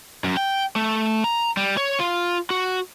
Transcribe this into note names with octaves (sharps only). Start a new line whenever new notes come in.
F#2
G5
A3
A#5
G3
C#5
F4
F#4